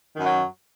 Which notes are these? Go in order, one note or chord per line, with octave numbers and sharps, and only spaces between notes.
F#2 D#3 F#3